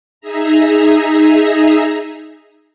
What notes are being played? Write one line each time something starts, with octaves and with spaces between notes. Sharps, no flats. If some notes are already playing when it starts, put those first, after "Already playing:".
D#4 G#4 E5 A#5